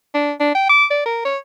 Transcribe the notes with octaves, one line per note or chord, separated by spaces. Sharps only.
D4
D4
G5
D6
D5
A#4
C#5